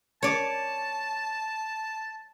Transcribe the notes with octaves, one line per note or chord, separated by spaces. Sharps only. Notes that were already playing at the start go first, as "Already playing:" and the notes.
C#5 D5 A5